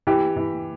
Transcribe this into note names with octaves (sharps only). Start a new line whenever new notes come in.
E3 G4
E3